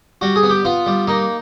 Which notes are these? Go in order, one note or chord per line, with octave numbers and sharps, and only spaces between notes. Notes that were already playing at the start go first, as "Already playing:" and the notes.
G3 F#4
G#4
B3
G4
B3 F4
G3
A#3 D#4